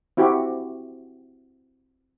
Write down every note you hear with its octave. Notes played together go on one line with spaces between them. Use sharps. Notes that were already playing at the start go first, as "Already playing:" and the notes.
C4 E4 F#4 G4